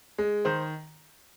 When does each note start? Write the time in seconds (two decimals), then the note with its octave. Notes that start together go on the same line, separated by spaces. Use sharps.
0.18 G#3
0.45 D#3 C5